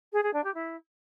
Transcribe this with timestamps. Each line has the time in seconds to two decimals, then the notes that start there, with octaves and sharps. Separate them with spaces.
0.13 G#4
0.23 G#4
0.34 D4
0.44 G4
0.54 E4